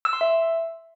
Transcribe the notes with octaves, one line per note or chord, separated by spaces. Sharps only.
E6
C6
E5